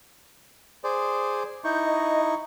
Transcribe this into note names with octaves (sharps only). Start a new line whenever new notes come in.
G#4 C5 D5
D#4 E4 C#6 G6
D#5